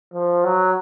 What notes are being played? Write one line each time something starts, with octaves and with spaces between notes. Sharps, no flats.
F3
F#3